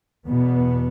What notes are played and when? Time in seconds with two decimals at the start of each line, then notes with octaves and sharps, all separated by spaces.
0.26 E2 B2 B3